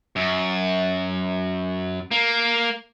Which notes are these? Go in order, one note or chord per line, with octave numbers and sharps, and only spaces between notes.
F#2
A#3